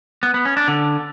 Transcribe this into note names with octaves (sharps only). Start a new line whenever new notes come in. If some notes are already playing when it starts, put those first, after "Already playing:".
B3
B3
C#4
D4
D3